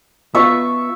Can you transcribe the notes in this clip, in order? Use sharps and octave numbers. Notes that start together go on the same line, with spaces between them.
B3 F4 E5 C#6